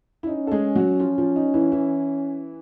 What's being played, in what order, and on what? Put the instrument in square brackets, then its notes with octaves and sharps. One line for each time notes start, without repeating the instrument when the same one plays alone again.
[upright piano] E4
[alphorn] C#4 [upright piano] D#4
[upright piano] A4
G#3 G#4
F#3 F#4
F3 F4
F3 F4
D#4
E3 E4
E3 E4